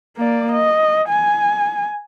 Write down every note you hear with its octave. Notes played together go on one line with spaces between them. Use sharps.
A#3 D5
D#5
G#5